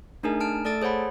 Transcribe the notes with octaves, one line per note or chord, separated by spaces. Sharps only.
A3 D4 D#4 G#4 A#4 G#5
A5 F6 D7
A3 A4 D5 A5 A6 D7
G#4 C5 C#5 F#5 B5